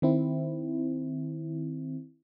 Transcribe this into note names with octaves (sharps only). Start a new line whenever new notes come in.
D#3 C4 E4